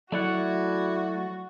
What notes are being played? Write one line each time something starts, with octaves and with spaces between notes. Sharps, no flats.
F#3 A3 E4 F#4 D5 F#5